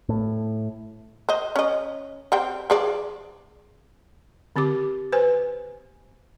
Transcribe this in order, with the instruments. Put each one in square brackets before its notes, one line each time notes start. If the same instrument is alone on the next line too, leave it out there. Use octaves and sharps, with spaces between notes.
[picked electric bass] A2
[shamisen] C5 D#5
C#4 D#5
G3 C4 G5
F3 G#4 D5
[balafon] D3 C4 G4 D6
B4 C5 G#5